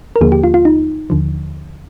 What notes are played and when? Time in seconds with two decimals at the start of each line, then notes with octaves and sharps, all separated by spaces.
0.16 A#4
0.21 D#2 D3 F3 A#3 G#4
0.32 G4
0.44 F4
0.54 F4
0.65 D#4
1.10 D#2 D3 F3